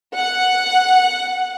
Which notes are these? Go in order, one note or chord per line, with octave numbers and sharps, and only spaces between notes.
F#5